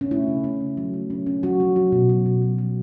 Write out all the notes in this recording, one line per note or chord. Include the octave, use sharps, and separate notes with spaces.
C#4
A3 E4
C#3
C#4
A3
F#3
A3
C#4
C#4
F#3 F#4
F#3
F#3
B2
F#3
B2
F#3
F#3